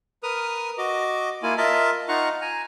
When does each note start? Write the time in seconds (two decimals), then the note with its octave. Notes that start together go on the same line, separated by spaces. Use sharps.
0.23 A#4 B4 D#6 F6
0.78 F#4 D#5 D6
1.43 A#3 E4 F4 G#5
1.57 F4 A#4 D#5 E5 A5
2.08 D#4 F4 F5 F#5 A#5 C#6
2.42 G#5 A#5